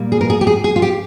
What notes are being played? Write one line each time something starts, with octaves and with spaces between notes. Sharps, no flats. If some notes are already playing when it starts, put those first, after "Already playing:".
Already playing: A#2 G3 A#3
G#4
A#4
G#4
G4
G#4
G#4
F4
G4